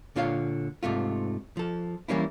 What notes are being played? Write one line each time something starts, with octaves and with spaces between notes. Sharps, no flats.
A#2 D3 F4 C#5 F5
G#2 C3 A3 F4
F3 A4
E3 G3 A#3 C#4 E4